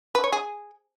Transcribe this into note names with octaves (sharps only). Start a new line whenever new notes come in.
B4
C#5
G#4